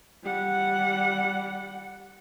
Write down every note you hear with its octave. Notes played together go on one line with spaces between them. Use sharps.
G3 F#5